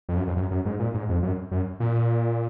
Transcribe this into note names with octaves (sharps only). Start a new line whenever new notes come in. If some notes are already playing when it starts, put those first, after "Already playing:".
F2
F#2
F2
F#2
F#2
G#2
A#2
G#2
F2
F#2
F#2
A#2